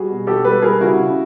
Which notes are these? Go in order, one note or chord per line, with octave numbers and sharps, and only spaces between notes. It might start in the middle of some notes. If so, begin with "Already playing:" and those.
Already playing: G3 F#4 G#4
B2
B2 G4 A4
G3 A4 B4
G3 G#4 A#4
C#3 E4 F#4
C#3